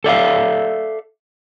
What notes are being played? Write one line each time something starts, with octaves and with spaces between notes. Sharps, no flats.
A4 D5 E5 F5